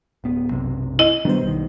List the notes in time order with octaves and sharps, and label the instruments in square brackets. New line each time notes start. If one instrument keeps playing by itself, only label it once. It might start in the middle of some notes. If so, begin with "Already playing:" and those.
[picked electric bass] D1 B3
B1 F#2 C3
[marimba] E4 D#5
[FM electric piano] G2 B2 C5 [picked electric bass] D#3 F#3 D4
[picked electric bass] B1 D#3